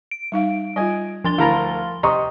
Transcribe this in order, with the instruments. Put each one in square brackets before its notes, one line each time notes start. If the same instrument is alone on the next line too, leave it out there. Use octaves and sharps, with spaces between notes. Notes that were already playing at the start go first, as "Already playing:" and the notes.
[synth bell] D7
[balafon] G3 D#4 F5
[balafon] G3 F4 [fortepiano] D#5 G#5
[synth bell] F3 C6 G7 [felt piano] D4 A6
[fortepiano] D2 A#4 A#5 [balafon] E4 B5 [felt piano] F5
[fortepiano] C3 [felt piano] D#5 C#6 D#6 [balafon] A#5 C6